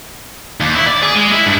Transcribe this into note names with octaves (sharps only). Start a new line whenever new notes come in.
D#2
E4
D5
G#4
G#3
E4
G2